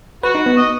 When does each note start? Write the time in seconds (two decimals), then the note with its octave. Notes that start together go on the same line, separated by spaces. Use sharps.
0.23 F#4 B4
0.35 D#4
0.46 B3
0.57 D#5